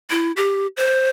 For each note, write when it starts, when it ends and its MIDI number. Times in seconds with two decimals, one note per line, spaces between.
0.10 0.32 64
0.37 0.67 67
0.77 1.09 72